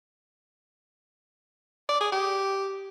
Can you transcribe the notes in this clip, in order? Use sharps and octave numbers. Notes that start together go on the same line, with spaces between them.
D5
G#4
G4